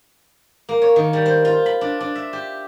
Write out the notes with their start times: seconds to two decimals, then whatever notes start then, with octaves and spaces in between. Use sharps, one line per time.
0.69 A#3
0.82 C#5
0.96 D#3
1.13 G3
1.26 C5
1.45 F4
1.66 B5
1.81 D4
2.00 D4
2.15 E5
2.33 G4